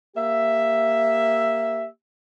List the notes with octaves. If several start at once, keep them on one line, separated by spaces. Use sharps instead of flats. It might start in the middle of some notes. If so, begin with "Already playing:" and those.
A#3 G4 E5